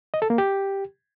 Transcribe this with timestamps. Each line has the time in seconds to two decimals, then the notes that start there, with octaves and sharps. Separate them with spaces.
0.14 D#5
0.22 A4
0.30 A#3
0.38 G4